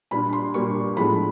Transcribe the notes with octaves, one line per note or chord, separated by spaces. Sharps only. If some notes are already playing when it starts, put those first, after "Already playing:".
A#2 G3 A#3 D4 B5
C6
A#2 G3 A#3 D4 C#6
A2 F3 G#3 B3 D4 B5